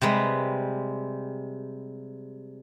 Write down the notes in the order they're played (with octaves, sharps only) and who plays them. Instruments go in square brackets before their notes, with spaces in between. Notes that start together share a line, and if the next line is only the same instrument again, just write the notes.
[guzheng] C3 G3 G#3 B4